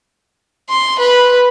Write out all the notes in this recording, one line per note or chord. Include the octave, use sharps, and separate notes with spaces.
C6
B4